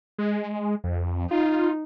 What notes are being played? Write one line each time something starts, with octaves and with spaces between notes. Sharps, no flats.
G#3
F2
D#4 F4